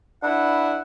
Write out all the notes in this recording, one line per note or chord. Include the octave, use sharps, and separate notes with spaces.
D4 E4 B4 F#5